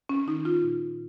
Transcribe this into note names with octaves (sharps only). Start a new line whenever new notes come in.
C#4
D#3 D#4
F4
A#2